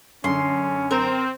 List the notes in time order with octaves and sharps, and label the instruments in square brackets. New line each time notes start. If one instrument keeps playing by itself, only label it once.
[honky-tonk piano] F#2 D3 [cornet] C#4 [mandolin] C6
[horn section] C4 [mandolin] A#4